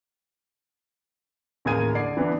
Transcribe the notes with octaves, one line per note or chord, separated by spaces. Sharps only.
A1 D#2 A#3 G#4 G#6 D#7
D3 D5 C7
E3 B3 D4